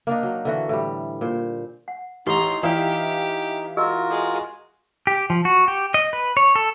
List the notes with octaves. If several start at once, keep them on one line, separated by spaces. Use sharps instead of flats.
A#3 D4 D#4
F#3
D3 E3 F#4
A2 G3
A#2 C5
F#5
A1 D#4 G4 A4 F#5 A#5 C6
E3 F4 G4 D5 E5 F5 A#5
F4 F#4 G#4 A#4 D#5 E6
G#3 A4
G4
F3
F#4
G4
D#5
B4
C#5
A4